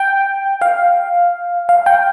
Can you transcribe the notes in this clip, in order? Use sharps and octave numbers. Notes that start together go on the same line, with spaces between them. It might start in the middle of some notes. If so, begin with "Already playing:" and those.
Already playing: G5
F5
F5
G5